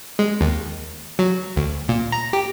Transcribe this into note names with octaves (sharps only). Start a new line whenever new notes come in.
G#3
D#2
F#3
D2
A#2
A#5
G4